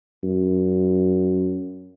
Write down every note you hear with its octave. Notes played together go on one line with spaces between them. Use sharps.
F#2